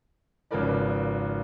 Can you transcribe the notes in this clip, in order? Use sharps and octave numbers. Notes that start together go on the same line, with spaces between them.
G#1 C#3 F3 A#4 B4 D5